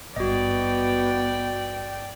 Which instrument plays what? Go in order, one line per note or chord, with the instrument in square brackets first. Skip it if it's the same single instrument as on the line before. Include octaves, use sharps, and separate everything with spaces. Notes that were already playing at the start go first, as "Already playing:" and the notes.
[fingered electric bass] G#1 G2 [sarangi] B3 [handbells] F#4 D#5 [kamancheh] D5 G5